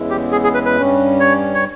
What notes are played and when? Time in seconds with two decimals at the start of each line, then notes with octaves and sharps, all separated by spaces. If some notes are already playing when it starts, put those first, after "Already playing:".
Already playing: E2 C#3 G#3 B3 E4
0.10 G4
0.32 G#4
0.44 G#4
0.54 B4
0.66 B4
0.77 G2 G3 C#4
1.20 C#5
1.54 C#5